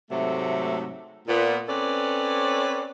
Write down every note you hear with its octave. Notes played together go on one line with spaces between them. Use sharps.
G#2 C3 F#3 A3
A#2 B3
C4 C#4 A4 B4 C#5 D5